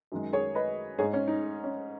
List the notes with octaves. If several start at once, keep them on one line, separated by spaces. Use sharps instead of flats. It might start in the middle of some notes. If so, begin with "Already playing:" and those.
F#2 D#3 G#3
G#4 C#5
B4 D#5
G#2 G#3 G#4 C#5
C#4
D#4
C#4